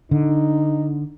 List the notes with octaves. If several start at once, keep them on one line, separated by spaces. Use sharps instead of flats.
D3 D#4